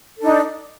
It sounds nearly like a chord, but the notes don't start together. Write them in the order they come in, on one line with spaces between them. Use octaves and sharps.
A4 D4 D#4